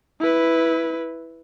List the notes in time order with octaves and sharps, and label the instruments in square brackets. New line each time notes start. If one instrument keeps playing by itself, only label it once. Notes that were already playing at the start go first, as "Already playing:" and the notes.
[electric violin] E4 B4